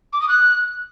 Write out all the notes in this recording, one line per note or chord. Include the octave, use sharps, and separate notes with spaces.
D6
D#6
F#6